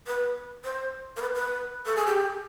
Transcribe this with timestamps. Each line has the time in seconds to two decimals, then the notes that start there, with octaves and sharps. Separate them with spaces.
0.07 B4
0.64 C5
1.17 A#4
1.21 B4
1.35 B4
1.86 A4
1.96 G#4
2.07 G4